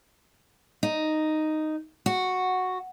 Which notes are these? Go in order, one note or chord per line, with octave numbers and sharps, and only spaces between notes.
D#4
F#4